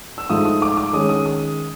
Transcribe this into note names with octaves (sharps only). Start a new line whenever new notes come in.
E6
G#2 F3 A3 D#6
D#6
D6
D6
D#3 G#3 C#4 D#6
D#6
D#6